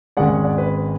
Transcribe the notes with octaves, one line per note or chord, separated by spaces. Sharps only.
G#1 G#2 G#3 C#4 D5 F#5
D5 F#5
B4